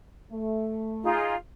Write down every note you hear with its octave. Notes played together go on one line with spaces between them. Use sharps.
A3
D#4 F4 G#4